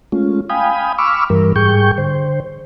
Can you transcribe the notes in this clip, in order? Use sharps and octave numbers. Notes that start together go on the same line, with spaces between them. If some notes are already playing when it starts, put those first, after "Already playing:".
G#3 A3 C#4 F4
F5 G5 G#5 B5 D#6
B5 C#6 D6 E6 F6
G2 E3 G3 A#4
G#2 G3 G#4 G5 C#6 G6
D3 C5